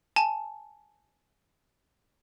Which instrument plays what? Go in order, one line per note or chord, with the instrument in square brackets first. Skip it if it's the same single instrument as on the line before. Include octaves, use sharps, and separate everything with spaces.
[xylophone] G#5 A5